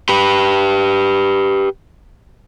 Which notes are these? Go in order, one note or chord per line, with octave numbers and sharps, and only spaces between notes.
G4 B4